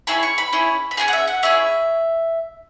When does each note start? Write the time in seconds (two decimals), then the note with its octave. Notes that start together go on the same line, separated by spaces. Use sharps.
0.07 C#4 E4 G#4 B5
0.23 C#6
0.38 B5
0.53 C#4 E4 G#4
0.91 B5
0.97 C#4 E4 G#4 G#5
1.08 F#5
1.13 E5
1.28 F#5
1.43 C#4 E4 G#4 E5